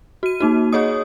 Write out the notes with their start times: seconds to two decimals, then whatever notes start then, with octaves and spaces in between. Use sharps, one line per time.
0.23 F#4 D#7
0.41 A#3 D#4 F#4
0.73 G#4 C#5 D#5 D#6